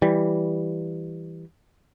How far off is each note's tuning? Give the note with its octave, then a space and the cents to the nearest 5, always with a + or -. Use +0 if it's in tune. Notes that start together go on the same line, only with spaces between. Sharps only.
E3 +0 G3 +0